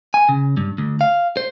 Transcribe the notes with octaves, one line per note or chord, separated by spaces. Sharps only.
G#5
C#3
G2
D2
F5
C5